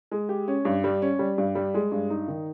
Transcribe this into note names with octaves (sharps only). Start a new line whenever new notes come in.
G#3
G4
C#4
G2
G3
C#4
G3
G2
G3
G#3
G2
D#4
D#3